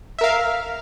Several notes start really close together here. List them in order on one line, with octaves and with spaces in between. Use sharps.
E5 A#4 F5